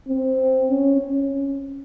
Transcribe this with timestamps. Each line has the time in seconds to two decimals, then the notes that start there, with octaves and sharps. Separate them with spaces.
0.08 C4
0.70 C#4
1.01 C#4